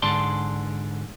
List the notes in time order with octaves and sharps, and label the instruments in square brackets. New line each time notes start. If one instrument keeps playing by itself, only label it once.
[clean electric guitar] G#2 D3 D5 A5 C6